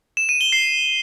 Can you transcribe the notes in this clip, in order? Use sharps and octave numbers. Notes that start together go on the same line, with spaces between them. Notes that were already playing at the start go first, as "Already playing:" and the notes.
E7
D#7
G7
C7